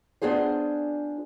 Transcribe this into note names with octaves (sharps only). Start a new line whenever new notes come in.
B3 D4 F4 G#4 C5